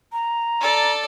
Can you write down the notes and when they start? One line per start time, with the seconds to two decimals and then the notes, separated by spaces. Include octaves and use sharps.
0.13 A#5
0.60 A4 D5